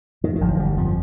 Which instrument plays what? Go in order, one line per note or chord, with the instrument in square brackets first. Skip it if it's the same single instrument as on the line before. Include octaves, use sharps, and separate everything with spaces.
[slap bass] F2 D#3
D#3
G1 F3
G1 G3
F2 F3